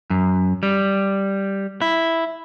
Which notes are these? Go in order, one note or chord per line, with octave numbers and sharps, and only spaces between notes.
F#2
G3
E4